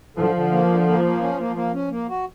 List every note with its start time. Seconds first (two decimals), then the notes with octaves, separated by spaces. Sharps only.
0.16 D3 F3
0.35 D3
0.52 A#3
0.69 D3
0.87 A#3
1.04 A#3
1.22 C#4
1.39 A#3
1.56 A#3
1.74 C#4
1.91 A#3
2.09 F#4